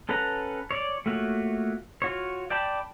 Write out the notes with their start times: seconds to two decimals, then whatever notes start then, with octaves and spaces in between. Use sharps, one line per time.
0.09 C#4 A4 B4 F#5 A#5
0.71 C#5 D5
1.06 A3 A#3 F4 F#4 C#5
2.02 F4 F#4 C#5
2.50 D5 G5 A5 B5